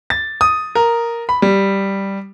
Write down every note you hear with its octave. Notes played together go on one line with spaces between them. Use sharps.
A6
D#6
A#4
B5
G3